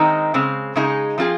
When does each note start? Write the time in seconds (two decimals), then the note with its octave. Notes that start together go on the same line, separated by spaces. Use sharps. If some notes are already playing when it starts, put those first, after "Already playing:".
Already playing: D#3 G#3 C4 D#4
0.34 C#3 G#3 C4
0.76 C#3 G#3 D#4 G#4
1.18 F3 C4 F4 G#4